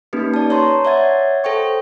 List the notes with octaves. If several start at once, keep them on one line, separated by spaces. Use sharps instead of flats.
A#3 C#4 D#4 G4 B4
D5 A5
C#5 A5 A#5 C6 C#6
C#5 D5 E5 F#5 G#6 A6
A4 C5 G5 C#6